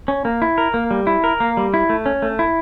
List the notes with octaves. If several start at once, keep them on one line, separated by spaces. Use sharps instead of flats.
C#4
A#3
E4
A#4
A#3
G3
E4
A#4
A#3
G3
E4
A3
C#4
A3
E4